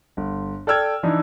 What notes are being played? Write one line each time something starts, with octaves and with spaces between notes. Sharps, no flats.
G1
A4 D5 G5 E6 F6 G#6
E3 D4 D#4